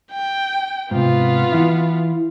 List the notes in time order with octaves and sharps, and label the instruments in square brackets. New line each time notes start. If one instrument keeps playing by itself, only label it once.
[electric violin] G5
[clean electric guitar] G#2 C3 [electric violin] B3 F4
[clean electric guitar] E3 E4